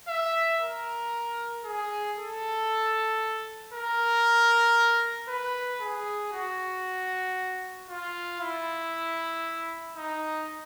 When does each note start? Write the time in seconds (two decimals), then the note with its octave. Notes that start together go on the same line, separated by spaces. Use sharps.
0.08 E5
0.61 A#4
1.65 G#4
2.17 A4
3.73 A#4
5.28 B4
5.81 G#4
6.33 F#4
7.90 F4
8.41 E4
9.97 D#4